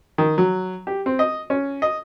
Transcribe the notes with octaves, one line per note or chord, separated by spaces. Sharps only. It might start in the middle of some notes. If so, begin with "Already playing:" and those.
D#3
F#3
G4
C4
D#5
C#4
D#5